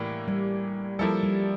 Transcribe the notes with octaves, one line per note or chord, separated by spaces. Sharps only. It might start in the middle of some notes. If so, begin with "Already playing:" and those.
Already playing: A2 E3 G3 A#3 D4
G3
F3 G3 A#3 E4 A4
G3